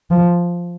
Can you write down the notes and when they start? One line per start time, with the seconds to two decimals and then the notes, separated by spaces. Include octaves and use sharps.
0.11 F3